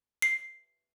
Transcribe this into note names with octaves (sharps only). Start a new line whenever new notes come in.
C7